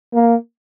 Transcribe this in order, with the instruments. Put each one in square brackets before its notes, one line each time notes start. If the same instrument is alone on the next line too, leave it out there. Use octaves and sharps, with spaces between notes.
[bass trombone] A#3